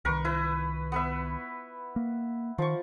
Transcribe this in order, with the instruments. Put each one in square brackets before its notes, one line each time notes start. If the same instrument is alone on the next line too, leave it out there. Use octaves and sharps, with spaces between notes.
[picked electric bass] C2 D#3 [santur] A#4 B4 C#6
[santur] E4 B4
B3 B4 E5
[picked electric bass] A#3
[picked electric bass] D#3 [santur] F3 C#6